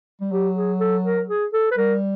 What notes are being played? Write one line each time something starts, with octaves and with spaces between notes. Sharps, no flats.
G3
F#3 G4
G#4
A4
A#4
G#4
A4
B4
G3 A#4